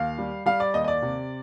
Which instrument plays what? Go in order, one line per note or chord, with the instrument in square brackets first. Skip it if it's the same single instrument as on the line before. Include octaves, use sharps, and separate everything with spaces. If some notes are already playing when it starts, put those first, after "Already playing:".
Already playing: [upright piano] D#2 F5
G3
G3 F5
D5
D#2 D#5
D#5
D5
C3